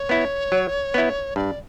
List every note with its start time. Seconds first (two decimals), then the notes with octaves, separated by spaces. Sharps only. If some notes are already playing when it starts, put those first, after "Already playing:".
Already playing: C#5
0.09 B3 E4
0.52 F#3
0.94 B3 E4
1.36 G2 D5